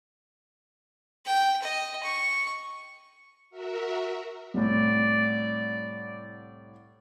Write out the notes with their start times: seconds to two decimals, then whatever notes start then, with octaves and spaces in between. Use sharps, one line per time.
1.26 G5
1.62 D#5
2.04 C#6
3.50 F#4 A#4 E5
4.54 C2 A2 D5